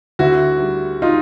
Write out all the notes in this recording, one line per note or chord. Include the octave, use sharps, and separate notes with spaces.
D2 E4 F#4
G3
D#4 F4